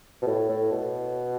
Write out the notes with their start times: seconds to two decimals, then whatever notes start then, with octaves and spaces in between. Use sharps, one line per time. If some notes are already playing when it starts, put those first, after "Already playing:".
0.22 B2
0.27 A2
0.49 A2
0.71 B2